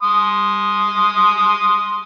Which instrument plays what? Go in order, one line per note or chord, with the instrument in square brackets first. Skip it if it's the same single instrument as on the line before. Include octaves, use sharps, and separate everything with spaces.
[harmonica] C6 D#6